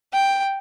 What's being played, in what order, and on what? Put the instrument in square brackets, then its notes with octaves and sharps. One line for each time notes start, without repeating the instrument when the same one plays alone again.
[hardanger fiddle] G5